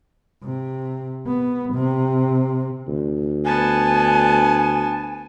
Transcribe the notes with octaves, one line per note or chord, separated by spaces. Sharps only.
C3
B3
C3
D2
B3 G#5 A5